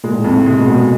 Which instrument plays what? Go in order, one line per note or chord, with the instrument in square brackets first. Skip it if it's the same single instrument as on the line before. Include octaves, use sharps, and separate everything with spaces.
[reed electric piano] A#2 [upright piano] G#3
[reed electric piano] A2
[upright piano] F2 [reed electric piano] G#2
[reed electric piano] A2
[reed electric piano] C3 [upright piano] G#3
[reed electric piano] B2
A#2
[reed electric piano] B2 [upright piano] G#3